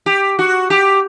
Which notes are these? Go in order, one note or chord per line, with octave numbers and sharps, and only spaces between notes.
G4
F#4
G4